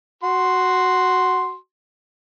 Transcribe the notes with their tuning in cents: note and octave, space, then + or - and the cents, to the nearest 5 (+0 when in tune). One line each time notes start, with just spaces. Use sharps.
F#4 +0 C6 +0